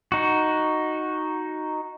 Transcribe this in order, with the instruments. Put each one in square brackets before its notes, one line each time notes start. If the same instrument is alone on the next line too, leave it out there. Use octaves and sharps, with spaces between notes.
[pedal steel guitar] D#4 F#4